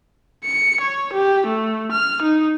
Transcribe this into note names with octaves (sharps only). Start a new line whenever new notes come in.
C#7
C#5
G4
A3
F6
D#4